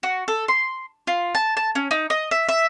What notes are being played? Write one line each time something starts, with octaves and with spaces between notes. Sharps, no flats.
F#4
A4
C6
F4
A5
A5
C#4
D#4
D#5
E5
E5